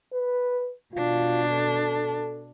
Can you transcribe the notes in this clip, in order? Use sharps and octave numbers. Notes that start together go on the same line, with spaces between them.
B4
B2 D4 F4
A4